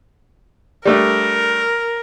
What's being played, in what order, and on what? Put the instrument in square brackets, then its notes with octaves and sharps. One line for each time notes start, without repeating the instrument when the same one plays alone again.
[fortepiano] G3 A3 D4 [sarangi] A#4